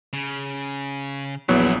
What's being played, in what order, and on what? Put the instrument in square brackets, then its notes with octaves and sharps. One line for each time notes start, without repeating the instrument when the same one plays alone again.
[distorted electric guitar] C#3
[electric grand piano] A#1 B3 [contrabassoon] E2 [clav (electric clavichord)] F#3 [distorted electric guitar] E4 D5